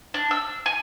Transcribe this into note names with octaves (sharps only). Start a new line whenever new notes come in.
D4
E6
G#5